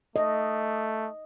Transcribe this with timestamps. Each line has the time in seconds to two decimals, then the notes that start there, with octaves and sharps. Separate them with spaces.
0.16 A3 D#5